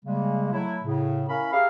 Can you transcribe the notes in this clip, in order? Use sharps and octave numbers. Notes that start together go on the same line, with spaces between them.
C#3 G3 G#3 A#3
F#3 A3 E4
A2 C#3
C#4 E4 A#4 C#5 F5 B5
G4 G#4 A#4 E5 F5